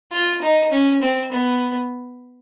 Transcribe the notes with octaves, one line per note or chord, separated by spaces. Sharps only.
F4
D#4
C#4
C4
B3